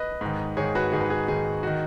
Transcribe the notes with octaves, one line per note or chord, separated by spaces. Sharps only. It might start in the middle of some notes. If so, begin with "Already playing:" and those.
Already playing: B4 D#5
G#2 D#3
G#2 D#3 G#4 C#5
F#4 B4
G#2 D#3 G#4
B4
G#4
G#2 D#3 G#4
D#3 F#4